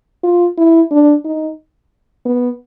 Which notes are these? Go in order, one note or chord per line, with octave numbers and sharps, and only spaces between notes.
F4
E4
D4
D#4
B3